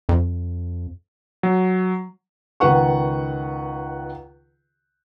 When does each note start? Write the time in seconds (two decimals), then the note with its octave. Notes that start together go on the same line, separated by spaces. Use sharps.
0.09 F2
1.43 F#3
2.60 C#2 D#3 B4 F#5 C#6